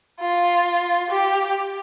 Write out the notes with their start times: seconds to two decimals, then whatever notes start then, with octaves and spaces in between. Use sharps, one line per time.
0.21 F4
1.10 G4